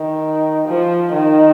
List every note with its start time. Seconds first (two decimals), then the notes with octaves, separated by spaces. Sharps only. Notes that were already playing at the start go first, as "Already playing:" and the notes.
Already playing: D#3
0.68 F3
1.13 D#3